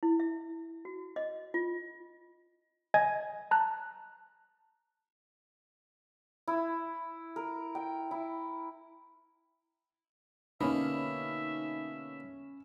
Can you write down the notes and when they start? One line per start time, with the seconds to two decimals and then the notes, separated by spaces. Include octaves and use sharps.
0.03 E4
0.20 E5
0.85 F#4
1.16 D#5
1.54 F4
2.94 D#5 G#5 G#6
3.51 A5 A#5 F#6
6.48 E4
7.36 A#4
7.75 G5
8.11 E4
10.61 B2 D3 A#3 C#4 D#4 E5 B5